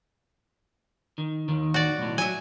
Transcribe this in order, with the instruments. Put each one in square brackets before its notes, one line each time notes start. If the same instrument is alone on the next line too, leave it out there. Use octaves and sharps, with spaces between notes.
[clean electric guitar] D#3
D#2 D#3
[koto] F#4 D5
[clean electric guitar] B1 A2
[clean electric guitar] F#3 [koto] E5 G#5